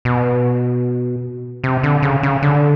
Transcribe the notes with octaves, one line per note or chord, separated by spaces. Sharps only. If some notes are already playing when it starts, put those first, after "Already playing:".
B2
C3
D3
C#3
C#3
D3